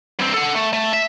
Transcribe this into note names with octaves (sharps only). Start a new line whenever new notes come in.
G2 C4
A4 F#5
A3
A3
E5